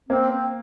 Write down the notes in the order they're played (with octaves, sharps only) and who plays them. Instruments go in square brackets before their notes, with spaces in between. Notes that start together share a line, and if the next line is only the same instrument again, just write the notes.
[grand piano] A#3 [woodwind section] C4
[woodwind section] C4